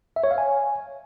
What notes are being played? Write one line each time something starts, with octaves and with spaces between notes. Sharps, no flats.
E5
C#5
F5
G#5